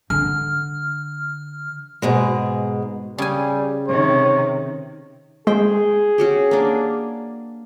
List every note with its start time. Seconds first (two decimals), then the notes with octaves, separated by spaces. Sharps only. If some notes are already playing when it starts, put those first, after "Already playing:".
0.10 D3 F6
2.02 G#2 B2 G#3
3.18 C#3 G3 G#5
3.88 C3 D#3 C#5
5.47 G#3 G#4 C5 G5
6.18 C#4 F#4 G4
6.51 A#3 D4